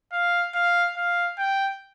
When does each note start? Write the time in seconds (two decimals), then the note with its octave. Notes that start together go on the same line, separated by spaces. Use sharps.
0.12 F5
0.55 F5
0.96 F5
1.39 G5